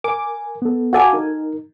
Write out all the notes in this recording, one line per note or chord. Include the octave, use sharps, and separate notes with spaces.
A#4 G#5 D6
B3 A4
F#4 A4 F5 G#5 D6
D#4 A#4